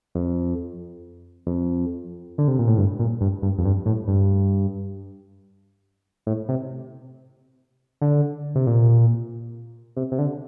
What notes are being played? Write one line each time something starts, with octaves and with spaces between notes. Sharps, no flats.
F2
F2
D3
C3
A#2
A2
G2
A#2
G2
G2
F2
G2
A2
G2
A2
C3
D3
C3
A#2
C3
C3
D3